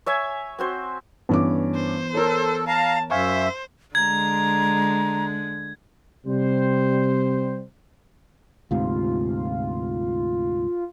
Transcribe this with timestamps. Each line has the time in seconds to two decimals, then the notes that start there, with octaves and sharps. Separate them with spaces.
0.06 C#5 E5 G#5
0.58 C4 F#4 C5
1.29 G2 E3 B3 C#4 D6
1.76 C5
2.14 A4 A#4 C#5
2.67 F5 A5 A#5
3.11 F#2 C5 E5 F5 G#5 C#6
3.95 D3 G#3 A#5 G#6
6.27 C3 G3 C5
8.71 D2 G#2 C3 F4